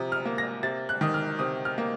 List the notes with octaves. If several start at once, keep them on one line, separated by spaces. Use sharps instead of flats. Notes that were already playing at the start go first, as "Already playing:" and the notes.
Already playing: C3 F3 A#5 D#6
F6
A#3
A#6
C3 A6
F#6
D#3 D#6
F6
C3 D#6
F6
A#3